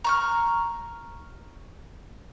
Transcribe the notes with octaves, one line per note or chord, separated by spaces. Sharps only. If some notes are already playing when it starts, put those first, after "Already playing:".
A#5 C#6 F6